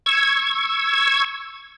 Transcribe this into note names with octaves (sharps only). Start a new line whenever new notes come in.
C#6 E6 G#6